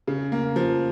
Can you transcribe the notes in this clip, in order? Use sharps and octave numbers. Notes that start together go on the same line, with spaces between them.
C#3
A#3
F3